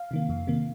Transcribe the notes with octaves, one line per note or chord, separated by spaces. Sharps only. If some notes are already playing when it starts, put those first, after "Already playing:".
Already playing: F5
C3 D#3 A#3
F2
C3 D#3 A#3